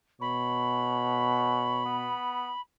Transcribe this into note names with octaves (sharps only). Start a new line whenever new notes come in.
B2 C#5 B5
B3